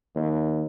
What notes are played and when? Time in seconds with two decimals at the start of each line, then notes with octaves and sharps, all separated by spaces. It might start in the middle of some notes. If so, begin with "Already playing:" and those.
0.16 D#2